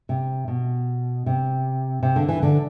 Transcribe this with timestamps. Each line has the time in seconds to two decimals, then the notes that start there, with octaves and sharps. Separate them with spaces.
0.09 C3
0.48 B2
1.26 C3
2.03 C3
2.16 D3
2.28 E3
2.42 D3